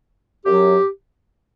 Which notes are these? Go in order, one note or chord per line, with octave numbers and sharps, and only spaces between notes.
F#2 F#3 G4